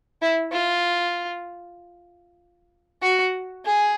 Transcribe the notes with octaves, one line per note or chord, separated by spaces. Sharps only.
E4
F4
F#4
G#4